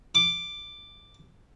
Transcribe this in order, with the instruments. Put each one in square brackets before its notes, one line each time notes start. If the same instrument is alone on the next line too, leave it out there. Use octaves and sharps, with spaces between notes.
[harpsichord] D6